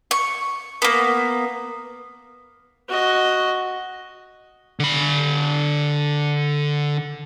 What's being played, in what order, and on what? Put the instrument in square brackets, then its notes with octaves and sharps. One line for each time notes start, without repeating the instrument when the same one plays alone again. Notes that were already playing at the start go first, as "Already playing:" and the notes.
[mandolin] C#6
A#3 B3
[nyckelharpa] F#4 D#5
[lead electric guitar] D3 B5